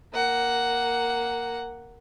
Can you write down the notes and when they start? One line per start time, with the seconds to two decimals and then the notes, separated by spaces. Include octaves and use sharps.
0.13 A#3 F#5